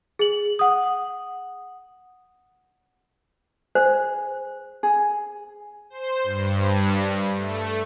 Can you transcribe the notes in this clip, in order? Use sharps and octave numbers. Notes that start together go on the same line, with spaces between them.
G#4 F#7
F#5 D#6
G#4 C5
G#4
C5
G2
A3